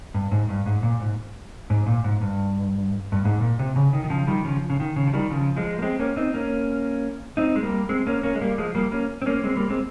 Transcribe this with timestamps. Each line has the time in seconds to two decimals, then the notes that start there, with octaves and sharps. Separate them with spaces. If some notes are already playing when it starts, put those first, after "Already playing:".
0.14 G2
0.31 G#2
0.49 G2
0.66 G#2
0.83 A#2
1.00 G#2
1.70 G#2
1.86 A#2
2.04 G#2
2.21 G2
3.12 G2
3.25 G#2
3.41 A#2
3.59 C3
3.76 C#3
3.93 D#3
4.04 D#3
4.10 C#3 F3
4.27 D#3 G3
4.44 C#3 F3
4.70 C#3
4.80 D#3
4.96 C#3
5.07 F3
5.13 D#3 G3
5.31 C#3 F3
5.56 F3 G#3
5.79 A#3
5.82 G#3 C4
5.99 A#3 C#4
6.16 C4 D#4
6.34 A#3 C#4
7.37 C4 D#4
7.56 G#3
7.63 G3 A#3
7.89 G#3 C4
8.07 A#3 C#4
8.23 A#3 C#4
8.35 G#3
8.41 G3 A#3
8.58 F3 G#3
8.75 G3 A#3
8.92 A#3 C#4
9.22 C4
9.26 A#3 C#4
9.44 G#3 C4
9.56 G3 A#3
9.69 G#3 C4